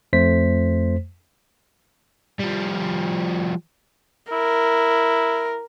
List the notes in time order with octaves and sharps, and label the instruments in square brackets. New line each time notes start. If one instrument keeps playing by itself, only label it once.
[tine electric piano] F2 A3 C5 B6
[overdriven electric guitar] F3 G3
[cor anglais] E4 [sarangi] A#4